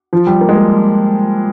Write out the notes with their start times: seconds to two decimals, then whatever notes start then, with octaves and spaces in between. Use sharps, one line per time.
0.13 F3
0.27 G3
0.41 A#3
0.49 G#3
0.55 A#3